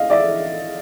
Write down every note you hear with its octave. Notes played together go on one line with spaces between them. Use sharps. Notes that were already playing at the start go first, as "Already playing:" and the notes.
Already playing: D#5 F5
D5 E5